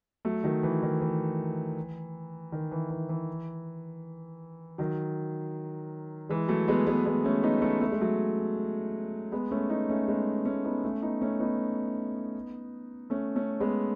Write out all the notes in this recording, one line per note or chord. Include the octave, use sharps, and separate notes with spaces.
F#3 A3
D#3 F#3
E3
D#3
E3
D#3
E3
E3
E3
D#3 F#3
E3 G#3
F#3 A3
G#3 B3
G#3 B3
G#3 B3
A3 C#4
B3 D#4
A3 C#4
A3
G#3
F#3 A3
G#3 B3
A3 C#4
B3 D#4
A3 C#4
G#3 B3
A3 C#4
B3 D#4
A3 C#4
B3 D#4
A3 C#4
B3 D#4
A3 C#4
A3 C#4
G#3 B3